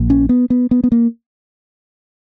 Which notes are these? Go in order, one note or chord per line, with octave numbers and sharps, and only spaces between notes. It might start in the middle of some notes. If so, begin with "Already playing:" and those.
Already playing: A#1 A#2
C#4
B3
B3
B3
B3
A#3